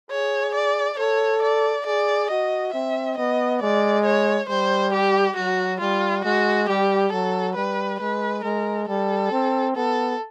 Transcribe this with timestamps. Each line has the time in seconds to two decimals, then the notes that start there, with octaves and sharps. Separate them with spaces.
0.11 G#4 C#5
0.55 D5
0.98 A4 C#5
1.42 D5
1.86 G#4 D5
2.30 F#4 D#5
2.73 C4 E5
3.18 B3 D#5
3.62 G#3 D5
4.06 C#5
4.49 G3 C5
4.93 G4
5.37 F#3 F#4
5.80 G3 F4
6.25 G#3 F#4
6.68 G3 G4
7.12 F#3 A4
7.56 G3 B4
8.00 G#3 B4
8.44 G#3 A#4
8.88 G3 A4
9.32 C4
9.76 B3 A4